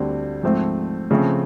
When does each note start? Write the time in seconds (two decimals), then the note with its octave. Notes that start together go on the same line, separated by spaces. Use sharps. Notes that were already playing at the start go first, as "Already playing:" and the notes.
Already playing: D2 D3 G3 C4
0.43 G#2 F3 A3 C4
1.11 C#3 F3 A3 C4